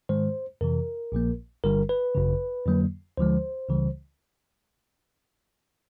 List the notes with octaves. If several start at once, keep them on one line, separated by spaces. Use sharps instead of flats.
G#2 D#3 G#3 C5
F2 C3 E3 A#4
A#1 A#2 F3 A#3
G1 G2 D3 G3 A#4
B4
G#1 F#2 C#3
F2 D3 F#3 A#3
D2 D3 F3 G#3 C5
C#2 C#3 E3 G3